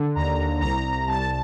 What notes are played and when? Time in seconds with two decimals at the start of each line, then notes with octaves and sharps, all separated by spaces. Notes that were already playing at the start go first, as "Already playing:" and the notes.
Already playing: D3
0.15 D#2 A#5
0.38 D#2
0.61 C2 A#5
0.85 C2
1.07 C2 A5